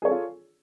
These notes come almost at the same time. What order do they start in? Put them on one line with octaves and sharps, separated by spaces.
G#4 C#5 A4 F4